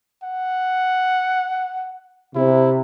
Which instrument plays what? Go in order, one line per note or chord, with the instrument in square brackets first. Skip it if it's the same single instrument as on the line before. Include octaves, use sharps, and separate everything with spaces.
[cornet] F#5
[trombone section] C3 [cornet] E4